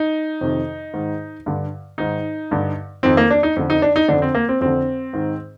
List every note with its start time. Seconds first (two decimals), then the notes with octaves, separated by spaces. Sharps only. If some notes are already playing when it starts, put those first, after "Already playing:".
Already playing: D#4
0.41 F2 C3 D#3
0.94 G#2 D#3
1.46 G2 D3
1.98 G#2 D#3 D#4
2.51 G2 D3
3.03 F2 D#3 C4
3.17 A#3
3.30 D4
3.43 D#4
3.56 F2 D3
3.70 D#4
3.82 D4
3.96 D#4
4.08 F2 D3 D4
4.22 C4
4.35 A#3
4.49 C4
4.61 F2 D3 C4
5.13 G#2 D#3